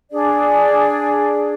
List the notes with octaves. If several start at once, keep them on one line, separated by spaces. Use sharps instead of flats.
D4 G#4 D5